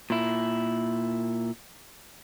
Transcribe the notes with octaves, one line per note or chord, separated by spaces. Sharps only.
A#2 E4